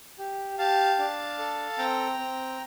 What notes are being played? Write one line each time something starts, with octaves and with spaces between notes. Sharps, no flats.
G4
G4 F5 A5
D4
A4
C4 G5 A#5
C4